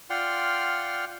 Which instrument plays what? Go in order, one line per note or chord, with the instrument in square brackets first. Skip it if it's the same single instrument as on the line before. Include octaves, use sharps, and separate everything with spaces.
[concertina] F4 D5 F#5 G5 C6 F6